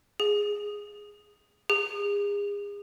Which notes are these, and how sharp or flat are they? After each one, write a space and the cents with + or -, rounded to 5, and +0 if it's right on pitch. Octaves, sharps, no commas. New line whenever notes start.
G#4 -5
G#4 -35